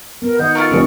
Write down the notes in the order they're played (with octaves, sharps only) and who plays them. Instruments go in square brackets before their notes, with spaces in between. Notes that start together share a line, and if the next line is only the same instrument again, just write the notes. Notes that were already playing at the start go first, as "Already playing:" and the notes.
[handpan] B3 [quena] A#4
[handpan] D#3 D#5 F#5 [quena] G6
[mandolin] A3 F4 A#4 [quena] C#6
[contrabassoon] F1 [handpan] D3 G#3 E4